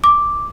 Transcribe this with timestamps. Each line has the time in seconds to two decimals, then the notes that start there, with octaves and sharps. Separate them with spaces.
0.04 D6